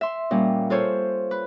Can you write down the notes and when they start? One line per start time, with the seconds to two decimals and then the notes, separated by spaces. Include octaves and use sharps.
0.01 E5 C6
0.31 A#2 G3 C#4
0.70 F4 A4 C5 C#5
1.31 B4